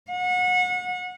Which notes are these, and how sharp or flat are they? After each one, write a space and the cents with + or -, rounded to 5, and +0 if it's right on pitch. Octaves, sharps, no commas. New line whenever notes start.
F#5 -30